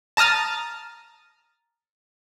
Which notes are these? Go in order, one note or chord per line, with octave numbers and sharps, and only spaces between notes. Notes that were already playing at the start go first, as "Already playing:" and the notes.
A5 A#5 D#6 F6 A6